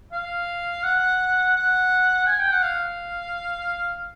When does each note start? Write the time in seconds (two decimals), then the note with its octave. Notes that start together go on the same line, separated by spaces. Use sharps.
0.13 F5
0.84 F#5
1.57 F#5
2.27 G#5
2.39 G5
2.52 F#5
2.63 F5